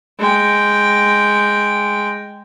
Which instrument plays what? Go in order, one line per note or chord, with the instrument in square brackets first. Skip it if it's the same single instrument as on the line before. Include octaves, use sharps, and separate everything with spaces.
[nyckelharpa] G#3 G5